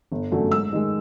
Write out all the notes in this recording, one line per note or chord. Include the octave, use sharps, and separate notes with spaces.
G1
F#2 D3 F#3 A3
G#2 E6
D#3 G#3